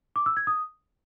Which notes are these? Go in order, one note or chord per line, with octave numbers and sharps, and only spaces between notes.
D6
E6
G#6
D#6